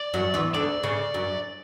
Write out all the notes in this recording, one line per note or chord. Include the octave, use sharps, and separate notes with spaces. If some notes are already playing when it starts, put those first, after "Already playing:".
Already playing: D5
F#2 F#3
E2 E3
D2 D3 D5
C#3
F#2